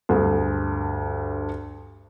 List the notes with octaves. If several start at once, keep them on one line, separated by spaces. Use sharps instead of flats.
D2 G2 G#4